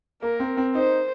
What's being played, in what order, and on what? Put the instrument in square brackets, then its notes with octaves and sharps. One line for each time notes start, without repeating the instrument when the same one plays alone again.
[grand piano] A#3 [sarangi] A#4
[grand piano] C4
C4
[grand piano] D#4 [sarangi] C5